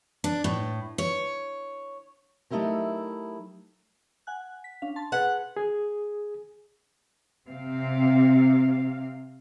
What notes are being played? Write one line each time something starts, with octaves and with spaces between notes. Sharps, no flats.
D4
A2
C#5
F#3 A3 D#4 E4 G4 A#4
F#5 G#5 F#6
B6
C#4 D4 F5
A5 C6 A6
G#4 B4 F#5
G#4
C3 C4 F5